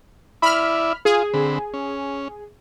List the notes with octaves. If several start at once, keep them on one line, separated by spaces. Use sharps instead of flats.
E4 D5 E5 B5 F6
F4 G#4
D3 C4 B5
C#4